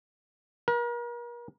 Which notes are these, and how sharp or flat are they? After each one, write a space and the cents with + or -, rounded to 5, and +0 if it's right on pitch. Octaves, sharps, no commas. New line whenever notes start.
A#4 +40